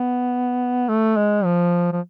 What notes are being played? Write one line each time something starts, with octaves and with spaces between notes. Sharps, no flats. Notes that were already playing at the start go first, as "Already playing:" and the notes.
Already playing: B3
A3
G#3
F3
F3